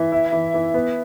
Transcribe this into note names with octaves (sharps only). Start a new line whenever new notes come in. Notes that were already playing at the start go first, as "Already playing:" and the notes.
Already playing: E3 E5
E4
E3
E3
B3